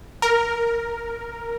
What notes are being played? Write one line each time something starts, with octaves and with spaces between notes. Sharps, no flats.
A#4